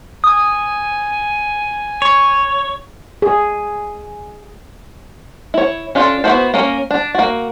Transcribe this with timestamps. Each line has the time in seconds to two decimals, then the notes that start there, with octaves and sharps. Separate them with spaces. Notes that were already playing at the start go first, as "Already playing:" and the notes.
0.24 G#5 D#6
2.02 C#5
3.22 G#4
5.54 E4 C#5
5.95 C#4 D4 F4 A4
6.24 B3 E4 F#4 A4 C5
6.54 A#3 C#4 A#4
6.91 D4
7.15 A#3 F#4